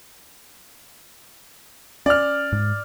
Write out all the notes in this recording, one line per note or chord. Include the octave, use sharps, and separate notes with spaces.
C#4 D5 F6
G#2